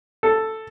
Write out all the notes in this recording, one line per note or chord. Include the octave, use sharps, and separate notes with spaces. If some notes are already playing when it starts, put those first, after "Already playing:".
A4